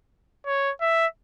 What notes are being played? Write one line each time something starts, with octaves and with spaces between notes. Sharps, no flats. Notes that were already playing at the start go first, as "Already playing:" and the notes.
C#5
E5